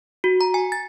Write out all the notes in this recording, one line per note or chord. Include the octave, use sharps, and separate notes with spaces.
F#4
A#5
G#5
A6